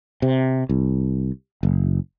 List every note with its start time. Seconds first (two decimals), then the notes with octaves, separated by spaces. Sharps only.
0.22 C3
0.69 C2
1.63 F#1